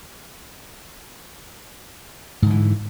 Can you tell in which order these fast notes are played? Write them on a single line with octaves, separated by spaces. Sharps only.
G#2 D3 E3